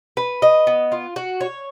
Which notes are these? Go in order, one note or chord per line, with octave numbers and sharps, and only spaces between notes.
B4
D#5
B3
F4
F#4
C#5